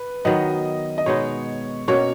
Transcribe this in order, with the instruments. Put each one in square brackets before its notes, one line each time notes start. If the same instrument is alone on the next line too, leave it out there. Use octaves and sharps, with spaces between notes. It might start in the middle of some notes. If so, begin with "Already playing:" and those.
Already playing: [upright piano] B4
[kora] D#3 F#3 B3 [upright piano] D#5
[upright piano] D#5
[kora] B2 G#3 B3 D#4 [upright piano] C#5
[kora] B2 A#3 C#4 F#4 [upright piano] C#5